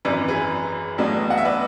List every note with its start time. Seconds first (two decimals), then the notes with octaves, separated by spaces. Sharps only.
0.05 G#1 F#2 E3 B4 D5
0.28 G#4 B4
0.98 A1 A2 F#3 B3 D4
1.30 F#5
1.38 E5
1.45 B4 D5